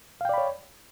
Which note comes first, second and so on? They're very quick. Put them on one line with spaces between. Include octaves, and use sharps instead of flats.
F5 G5 D5 B5 C#5